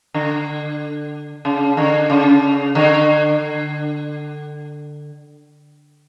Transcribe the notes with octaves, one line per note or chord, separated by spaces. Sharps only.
D3
C#3
D3
C#3
D3